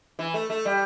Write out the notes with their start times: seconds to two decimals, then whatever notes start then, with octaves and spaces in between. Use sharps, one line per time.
0.19 E3
0.34 A3
0.50 A3
0.65 G3